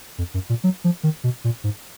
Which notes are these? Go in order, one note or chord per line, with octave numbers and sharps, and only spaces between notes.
F2
F#2
A#2
F#3
F3
D#3
B2
A#2
G#2